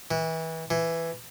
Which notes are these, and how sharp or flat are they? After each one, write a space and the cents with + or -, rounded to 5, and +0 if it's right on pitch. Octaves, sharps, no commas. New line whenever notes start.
E3 -25
E3 +10